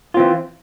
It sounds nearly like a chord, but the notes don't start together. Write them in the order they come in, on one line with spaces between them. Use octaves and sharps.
F4 C4 E3